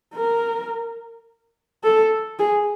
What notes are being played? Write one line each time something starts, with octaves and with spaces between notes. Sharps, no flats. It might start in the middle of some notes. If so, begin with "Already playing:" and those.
A#4
A4
G#4